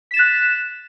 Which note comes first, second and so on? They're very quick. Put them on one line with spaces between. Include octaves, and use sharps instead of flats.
B6 E7 A6 F#6